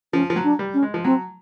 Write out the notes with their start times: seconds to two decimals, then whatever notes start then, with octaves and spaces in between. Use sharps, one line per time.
0.13 F3 C#4
0.30 F3
0.36 F#3
0.44 D4
0.59 G3
0.74 C#4
0.83 G#3
0.94 F3
1.05 F#3 C4